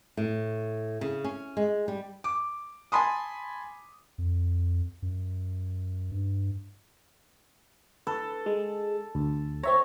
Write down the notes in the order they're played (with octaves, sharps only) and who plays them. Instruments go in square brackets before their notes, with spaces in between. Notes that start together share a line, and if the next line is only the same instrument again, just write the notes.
[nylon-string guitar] A2
C#3
C#4
G#3
G3
[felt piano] D6
G#5 A5 B5 C6 D#6
[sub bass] F2
F#2
G2
[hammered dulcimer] A4 [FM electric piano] B4
[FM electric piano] G#3
D2
[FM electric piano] C4 E5 A#5 [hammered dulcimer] C#5